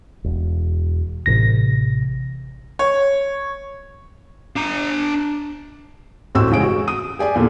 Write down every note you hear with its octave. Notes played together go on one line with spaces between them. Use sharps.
E1
A1 C3 A#6
C#5
D4 A#5
A1 D2 C4 F#4 G4 E6
F1 C#3 G#3 G#4 D7
F#4
D#6 D#7
G4 G#4 D5 G#5
E2 A#2 D3